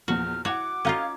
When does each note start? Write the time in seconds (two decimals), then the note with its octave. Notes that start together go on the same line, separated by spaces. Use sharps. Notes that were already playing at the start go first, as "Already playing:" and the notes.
0.08 E2 A#2 F3 F#4 F6
0.45 E4 F#4 C#5 F#5 D6
0.85 C#4 D#4 F4 F#4 F5 G#6